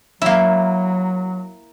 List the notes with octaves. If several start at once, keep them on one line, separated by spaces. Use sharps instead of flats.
F#3 A#3 E4